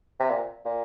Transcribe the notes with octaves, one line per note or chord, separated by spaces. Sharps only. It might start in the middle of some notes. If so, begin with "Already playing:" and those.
C3
A#2
A#2